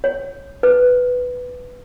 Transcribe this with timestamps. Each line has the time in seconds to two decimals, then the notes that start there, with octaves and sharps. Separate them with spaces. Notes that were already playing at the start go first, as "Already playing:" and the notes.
0.04 C#5
0.63 B4